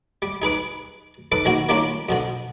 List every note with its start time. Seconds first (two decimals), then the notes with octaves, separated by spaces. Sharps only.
0.22 G3
0.42 D#4 G#4 B4 D6
1.32 D#4 A4 B4 D6
1.45 A#1 D#3 A#3 F#4
1.69 D#3 G3 A#3 C#4 D4 F4
2.09 F2 B2 D3